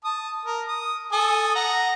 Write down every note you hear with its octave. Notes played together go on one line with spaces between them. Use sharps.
A5 D#6
A#4
D#6
A4 G#5 D#6
F#5 A#5